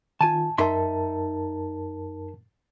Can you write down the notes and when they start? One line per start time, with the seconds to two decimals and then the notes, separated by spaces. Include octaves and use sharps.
0.21 D#3 F4 G#5 A5
0.58 F#2 D#4 A#4 E5 A5 C6